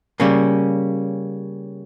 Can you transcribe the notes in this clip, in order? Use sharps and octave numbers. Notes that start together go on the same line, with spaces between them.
C#3 G3 A#3 C#4